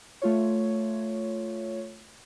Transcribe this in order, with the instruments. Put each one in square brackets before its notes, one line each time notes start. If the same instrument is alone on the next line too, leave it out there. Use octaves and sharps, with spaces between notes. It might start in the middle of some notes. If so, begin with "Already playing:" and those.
[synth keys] A3 F4 C#5